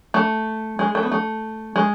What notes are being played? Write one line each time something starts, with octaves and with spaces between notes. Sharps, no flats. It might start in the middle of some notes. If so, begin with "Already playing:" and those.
A3
G#3
A3
B3
A3
G#3